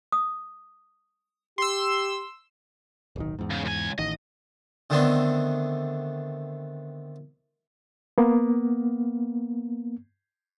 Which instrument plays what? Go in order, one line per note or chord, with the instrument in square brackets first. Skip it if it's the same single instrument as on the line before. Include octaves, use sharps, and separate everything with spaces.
[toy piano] D#6
[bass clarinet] G4 [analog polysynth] C6 E6
[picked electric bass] D1 B1 D#3
E2 G#2
[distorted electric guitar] C#3
C#2 G#5
[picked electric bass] A1 D#3 [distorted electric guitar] D#5
[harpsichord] D3 D#3 A3 B3 C4 D4
[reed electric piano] A#3 B3